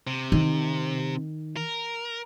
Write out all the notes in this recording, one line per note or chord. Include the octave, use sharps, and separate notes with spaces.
C3
D#3
A#4